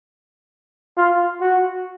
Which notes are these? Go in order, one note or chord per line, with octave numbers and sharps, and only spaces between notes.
F4
F#4